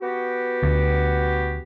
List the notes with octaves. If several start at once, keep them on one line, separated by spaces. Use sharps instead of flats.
B3 F#4 G4
D2